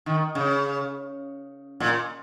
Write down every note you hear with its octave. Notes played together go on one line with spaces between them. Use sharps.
D#3
C#3
A#2